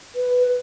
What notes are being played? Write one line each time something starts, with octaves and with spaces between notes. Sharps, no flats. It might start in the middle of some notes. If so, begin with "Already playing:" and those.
B4